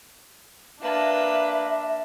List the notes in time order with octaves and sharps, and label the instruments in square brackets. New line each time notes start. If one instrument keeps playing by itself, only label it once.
[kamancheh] A#3 B4 [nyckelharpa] D4 A5 [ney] E5